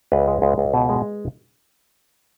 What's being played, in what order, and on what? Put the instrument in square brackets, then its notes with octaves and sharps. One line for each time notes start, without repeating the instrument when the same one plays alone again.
[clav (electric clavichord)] C#2 B4
G#3
C#2
C#2
B2
G#3